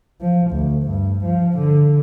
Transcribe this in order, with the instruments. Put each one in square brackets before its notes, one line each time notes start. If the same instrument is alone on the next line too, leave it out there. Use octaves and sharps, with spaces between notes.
[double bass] F3
D2
G2
F3
D3